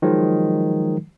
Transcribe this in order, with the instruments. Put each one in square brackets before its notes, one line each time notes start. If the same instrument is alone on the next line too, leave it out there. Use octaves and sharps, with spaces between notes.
[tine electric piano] D#3 F3 F#3 G#3